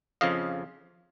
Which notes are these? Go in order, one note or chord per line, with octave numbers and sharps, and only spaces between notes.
F2 C#3 F3 D#5 F5